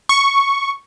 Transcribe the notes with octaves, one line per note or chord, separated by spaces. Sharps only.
C#6